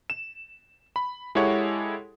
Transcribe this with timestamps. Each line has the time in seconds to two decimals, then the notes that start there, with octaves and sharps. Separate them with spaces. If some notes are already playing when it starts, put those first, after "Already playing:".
0.10 E7
0.96 B5
1.35 G#3 E4 G4 A4 C#5 F#5